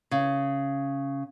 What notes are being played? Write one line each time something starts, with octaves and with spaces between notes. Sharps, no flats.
C#3